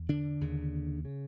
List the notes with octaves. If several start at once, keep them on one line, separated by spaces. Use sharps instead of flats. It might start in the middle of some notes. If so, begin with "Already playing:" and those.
Already playing: E2
D3 D4
D#2 C#3
C#3